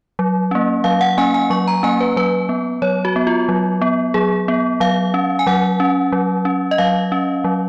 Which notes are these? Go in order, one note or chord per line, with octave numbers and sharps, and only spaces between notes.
F#3
A#3 C#4
F#3 F5
F#5
A#3 C#4 G#5
G#5
F#3 C#6
A#5
A#3 C#4 G#5
B4
F#3 B4
B3
F#3 C#5
F#4
B3
F4
F#3
B3
F#3 G#4
B3
F#3 F5
C#4
G#5
F#3 F#5
C#4
F#3
C#4
D#5
F#3 F5
C#4
F#3